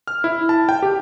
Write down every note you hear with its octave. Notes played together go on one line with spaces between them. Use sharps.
F6
E4
A5
G5
G4